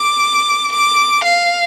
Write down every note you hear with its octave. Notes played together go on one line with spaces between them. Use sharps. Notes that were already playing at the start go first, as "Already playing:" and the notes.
Already playing: D6
D6
F5